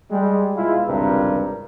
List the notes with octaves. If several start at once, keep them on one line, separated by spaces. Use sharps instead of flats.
G3 G#3
B2 G#3 E4 F4
G#1 C#2 G2 C3 A#4